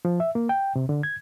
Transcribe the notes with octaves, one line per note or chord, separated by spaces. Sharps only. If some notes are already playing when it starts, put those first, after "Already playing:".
F3
E5
A#3
G5
C3
D3
G#6